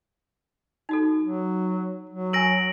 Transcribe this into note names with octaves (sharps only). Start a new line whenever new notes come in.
D#4 F#4 A4
F#3
F#3
A#4 G#5 A#6 D7 F#7